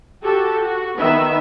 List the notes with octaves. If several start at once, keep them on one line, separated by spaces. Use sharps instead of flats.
F#4 G4 A4
F#4
D#3 B3 E5